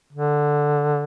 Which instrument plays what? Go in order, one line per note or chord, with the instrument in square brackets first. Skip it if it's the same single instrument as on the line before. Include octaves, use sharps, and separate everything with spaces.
[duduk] D3